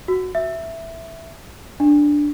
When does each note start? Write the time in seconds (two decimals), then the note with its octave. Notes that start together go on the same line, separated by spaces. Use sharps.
0.08 F#4
0.35 E5
1.80 D4